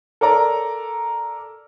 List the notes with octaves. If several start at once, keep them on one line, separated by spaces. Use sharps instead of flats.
A4 A#4 D5 A#5